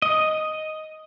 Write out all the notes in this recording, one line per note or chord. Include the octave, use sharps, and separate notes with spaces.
D#5